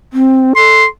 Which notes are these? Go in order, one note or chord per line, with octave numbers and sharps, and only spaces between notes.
C4
A4 C6